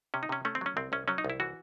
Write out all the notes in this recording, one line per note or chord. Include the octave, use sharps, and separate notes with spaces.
C3 C#4
D#4
C3 C#4
A3 C#4
C4
F#3 C#4
C2 C4
C2 C#4
F#3 C#4
D#4
C2
E4
E3 F#4